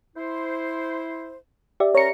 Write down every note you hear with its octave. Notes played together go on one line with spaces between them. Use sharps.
E4 C5
G4 D5 E5
C#4 A#4 C#5 A#5 C#7